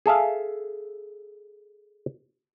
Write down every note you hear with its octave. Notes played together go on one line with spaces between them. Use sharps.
G#4 A4 E5 F5